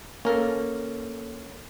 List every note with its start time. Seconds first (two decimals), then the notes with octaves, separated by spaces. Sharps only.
0.25 A#3 C#4 A4 A#4